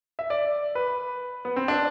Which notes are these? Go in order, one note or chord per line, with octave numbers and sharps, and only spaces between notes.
E5
D5
B4
B3
C4
D4